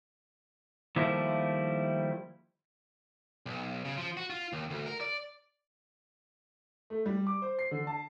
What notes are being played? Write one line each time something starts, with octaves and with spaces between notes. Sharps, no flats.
D#3 F3 G3 A3 A#3 E4
B1
C#3
F3
F#4
F4
D#2
D2
A#4
D5
A3
G3
D6
C5
C7
D3
A5